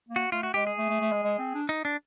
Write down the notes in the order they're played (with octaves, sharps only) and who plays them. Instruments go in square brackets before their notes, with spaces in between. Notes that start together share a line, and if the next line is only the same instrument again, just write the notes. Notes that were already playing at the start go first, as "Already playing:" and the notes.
[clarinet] A#3
[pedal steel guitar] F#4
[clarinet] A3 [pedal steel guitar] F4
[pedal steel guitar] F#4
[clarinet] G#3 [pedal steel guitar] G4
[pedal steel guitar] G#4
[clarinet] A3
A3
A3
G#3
G#3
C4
D4
[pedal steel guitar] D#4
D4